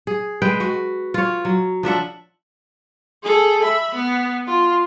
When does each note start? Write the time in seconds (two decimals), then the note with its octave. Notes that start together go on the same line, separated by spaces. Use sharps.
0.07 G#4
0.42 G#3 B4 G5
0.60 F#4
1.14 F4 C#5
1.45 F#3
1.83 F3 D4 E5 F#5
3.23 G#4 A4
3.63 E5 B5
3.95 B3
4.47 F4